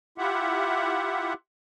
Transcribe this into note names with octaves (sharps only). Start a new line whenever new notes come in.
E4 F4 G4 E5 F#5